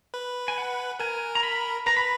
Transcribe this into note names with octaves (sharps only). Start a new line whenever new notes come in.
B4
G#5
F#5
A#4 G#5
A#5
B5
B4 A#5
B5